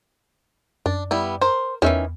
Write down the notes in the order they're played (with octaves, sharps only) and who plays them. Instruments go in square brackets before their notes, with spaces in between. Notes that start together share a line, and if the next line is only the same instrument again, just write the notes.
[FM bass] F#2 [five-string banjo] D4
[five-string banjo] G3 B3 E4
[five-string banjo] A#4 [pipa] C5
[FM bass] E2 [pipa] D#3 E3 [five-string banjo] C#4 E5